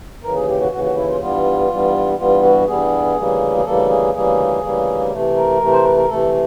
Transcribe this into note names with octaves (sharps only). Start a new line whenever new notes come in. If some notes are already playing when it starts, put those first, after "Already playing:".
D#2 C#3 E3 A#4
G#4
G4
F#4
D#2 C#3 E3 F#4
F#4
E4
F4
G2 E3 G3 B3 F4
G2 E3 G3 B3
G2 E3 G3 B3 F4
F#4
G2 E3 G3 B3 G#4
D2 C#3 E3 G3 A#3
G#4
D2 C#3 E3 G3 A#3 A4
G#4
D2 C#3 E3 G3 A#3 G#4
D2 C#3 E3 G3 A#3
C3 E3 A3
A#4
C3 E3 A3
C5
B4
A#4
C3 E3 A3 A4